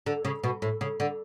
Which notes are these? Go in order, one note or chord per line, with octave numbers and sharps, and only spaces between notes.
D3
C#3
B2
A2
C#3
D3